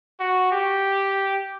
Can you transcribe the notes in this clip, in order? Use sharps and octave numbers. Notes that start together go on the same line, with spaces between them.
F#4
G4